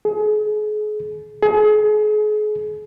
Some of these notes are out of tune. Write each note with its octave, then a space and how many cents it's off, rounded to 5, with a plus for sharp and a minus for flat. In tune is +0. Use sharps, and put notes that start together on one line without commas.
G#4 +35
G#4 +35